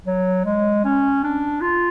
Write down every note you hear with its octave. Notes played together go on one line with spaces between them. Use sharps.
F#3
G#3
C#4
D4
F4